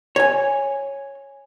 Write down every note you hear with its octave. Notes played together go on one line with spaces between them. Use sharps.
C#5 G#5